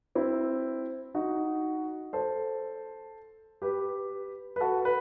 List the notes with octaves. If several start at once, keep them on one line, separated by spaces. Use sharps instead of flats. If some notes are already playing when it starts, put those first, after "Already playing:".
C4 E4
D#4 F#4
A4 C5
G4 B4
B4
F#4 A4
B4